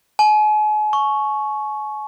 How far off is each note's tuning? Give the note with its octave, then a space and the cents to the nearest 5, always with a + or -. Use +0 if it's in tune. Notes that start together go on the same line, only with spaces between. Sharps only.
G#5 +40
C#6 +0